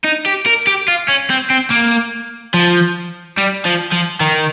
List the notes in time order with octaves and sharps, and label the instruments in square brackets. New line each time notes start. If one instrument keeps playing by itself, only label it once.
[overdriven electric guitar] D#4
G4
A#4
G4
F4
C#4
C4
C4
A#3
F3
G3
F3
F3
D#3